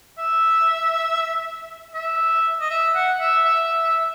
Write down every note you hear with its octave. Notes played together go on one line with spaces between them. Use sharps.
E5
E5
D#5
E5
F#5
E5
E5
E5
E5